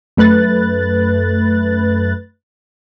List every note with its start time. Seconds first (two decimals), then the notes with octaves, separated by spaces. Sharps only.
0.17 F#2 A3 B4 F#6 A6